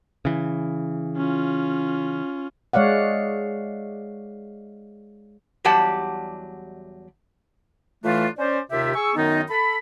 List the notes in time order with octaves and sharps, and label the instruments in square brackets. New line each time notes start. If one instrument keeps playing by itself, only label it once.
[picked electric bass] C#3 E3
[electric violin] C#4 F4
[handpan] G#3 C#5 D5 F5 F#5
[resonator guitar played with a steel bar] E2 F#3 G3 G4 F#5 A5
[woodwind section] A2 E3 A3 D4 F4
C#4 C5 D5
D#2 C3 F4 G4 E5
G#4 C#6 E6
F#2 D#3 B3 D#4
A4 B5